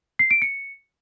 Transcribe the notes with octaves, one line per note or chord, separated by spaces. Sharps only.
C7
D7
C#7